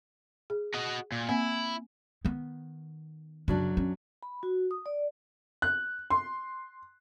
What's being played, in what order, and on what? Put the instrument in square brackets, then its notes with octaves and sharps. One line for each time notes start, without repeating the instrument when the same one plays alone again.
[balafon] G#4
[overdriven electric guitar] F#4 D#5
A#2
[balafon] A#3 C4 G#5 [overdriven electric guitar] E4
[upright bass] D#3 B3
[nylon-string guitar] F#2 F#3 D4 [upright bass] C#3
[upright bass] C#4
[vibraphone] B5
F#4
D#6
D5
[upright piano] F#6
C6